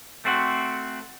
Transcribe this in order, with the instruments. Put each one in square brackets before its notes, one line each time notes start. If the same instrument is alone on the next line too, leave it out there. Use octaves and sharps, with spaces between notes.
[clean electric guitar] A3 C4 F#4